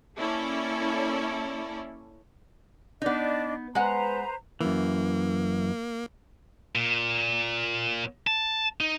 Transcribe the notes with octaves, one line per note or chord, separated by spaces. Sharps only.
A#3 C#4 E4 A4 C#5 D5
B3 D4 D#4 D5 D#5
G#3 B4 C5 F#5 A#5
F#2 E3 A#3
A#2
A5
D#4